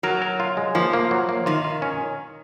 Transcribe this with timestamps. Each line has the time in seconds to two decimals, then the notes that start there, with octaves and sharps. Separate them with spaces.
0.03 F#3 A#4
0.22 A#4
0.40 F4
0.57 G#3
0.75 F3 A#3
0.93 A#3
1.11 F#3
1.29 A#3
1.46 D#3 F4
1.64 F4
1.82 C#4